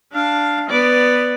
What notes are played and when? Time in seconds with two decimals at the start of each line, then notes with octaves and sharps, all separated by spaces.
0.13 D4 F5
0.70 B3 D5